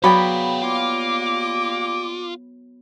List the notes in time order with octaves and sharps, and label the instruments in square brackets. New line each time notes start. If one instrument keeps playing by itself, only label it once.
[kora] F#3 B3 D5 [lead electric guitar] G#4 F5 [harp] G5 B5
[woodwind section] G3 A#3 D6 [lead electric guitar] F4